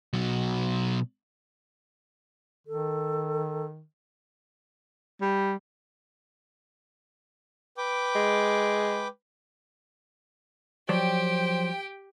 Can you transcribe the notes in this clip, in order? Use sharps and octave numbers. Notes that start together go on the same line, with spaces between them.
B2 F#3
D#3 A4
G3
B4 G5 D6
G#3
F3 F#3 G4 C5 D5 G5